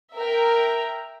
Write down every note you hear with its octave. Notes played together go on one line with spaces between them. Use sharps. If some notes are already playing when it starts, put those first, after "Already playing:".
A#4 E5 G5 A#5